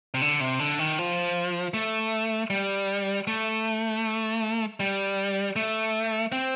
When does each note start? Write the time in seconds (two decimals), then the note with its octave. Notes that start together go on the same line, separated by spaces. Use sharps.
0.14 C3
0.21 D3
0.40 C3
0.59 D3
0.79 D#3
0.98 F3
1.74 A3
2.50 G3
3.27 A3
4.80 G3
5.56 A3
6.32 C4